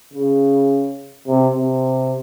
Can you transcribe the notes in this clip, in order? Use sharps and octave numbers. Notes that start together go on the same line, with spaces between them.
C#3
C3
C3